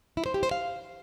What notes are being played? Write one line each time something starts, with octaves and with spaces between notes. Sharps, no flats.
E4
C5
G4
C5
F5